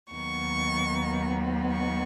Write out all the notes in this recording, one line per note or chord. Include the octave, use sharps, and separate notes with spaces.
D#2 D#3 F#3 B3 C#6
C#6